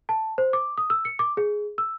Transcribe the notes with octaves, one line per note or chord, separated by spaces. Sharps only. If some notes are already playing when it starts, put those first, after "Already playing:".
A5
C5
D6
D#6
E6
C#7
D6
G#4
E6